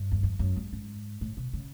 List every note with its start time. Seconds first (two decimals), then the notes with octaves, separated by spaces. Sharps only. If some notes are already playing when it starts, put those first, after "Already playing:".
Already playing: G2
0.12 E2
0.23 F2
0.39 F#2
0.56 G2
0.73 G#2
1.21 A2
1.37 B2
1.53 C#3